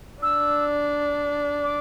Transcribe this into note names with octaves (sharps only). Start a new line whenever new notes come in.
D4 E6
D6